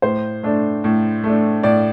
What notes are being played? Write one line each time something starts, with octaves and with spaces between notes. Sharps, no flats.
A2 C5
A3 D4
A2
A3 D4
A2 D5